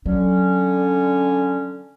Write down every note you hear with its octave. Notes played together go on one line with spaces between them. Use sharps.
D3 F#3 C#4